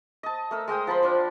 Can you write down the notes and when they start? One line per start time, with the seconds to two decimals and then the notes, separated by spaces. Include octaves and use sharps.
0.23 D#5 A5
0.51 A3 A#4 E6
0.68 G#3 D#5 G5 D#6
0.87 F3 A5 B5 C6
1.03 F3 D4 F4